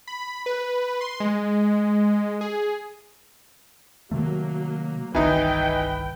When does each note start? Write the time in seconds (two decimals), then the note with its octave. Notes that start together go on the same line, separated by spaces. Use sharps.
0.07 B5
0.46 B4
1.01 C6
1.20 G#3
2.41 G#4
4.11 C3 D#3 F#3 A3 A#3
5.15 G1 C2 D#3 E3 D#4 E4 B4 G5